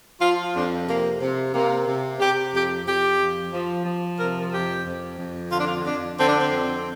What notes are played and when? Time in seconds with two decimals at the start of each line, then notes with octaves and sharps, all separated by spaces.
0.21 F3 F4
0.54 F2 D4
0.87 C3 A#3
1.21 C3
1.54 C3 A#3
1.87 C3
2.20 C3 G4
2.54 F2 G4
2.86 F2 G4
3.19 F3
3.52 F3
3.86 F3
4.18 C3 A#4
4.52 F2 G4
4.85 F2
5.19 F2
5.50 D3 F4
5.59 D4
5.65 F4
5.84 F2 D4
6.17 D3 C4
6.27 D4
6.38 C4
6.50 F2